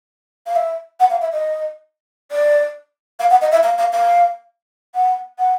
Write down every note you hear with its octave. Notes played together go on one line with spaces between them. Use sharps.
F5
E5
F#5
F5
E5
D#5
D5
F5
F#5
D#5
E5
F5
F5
F5
F#5
F#5